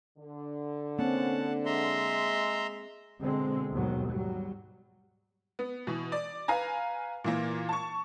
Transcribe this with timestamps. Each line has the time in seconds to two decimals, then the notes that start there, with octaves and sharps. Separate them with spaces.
0.18 D3
0.99 A#3 C4 C#4 F#5 A5
1.65 G#3 E5 A#5 C6
3.20 B2 D3 G#3 C4
3.72 D#2 G#2 B2 D#3 F#3
4.08 F#3 G3
5.59 B3
5.87 B2 E3
6.12 D5
6.48 B4 F5 G#5 A#5
7.24 A#2 E3 A#3
7.69 A5 C#6